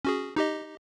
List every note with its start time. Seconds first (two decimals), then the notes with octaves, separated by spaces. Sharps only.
0.05 C#4 F#4 G#4
0.36 D#4 G4 D#5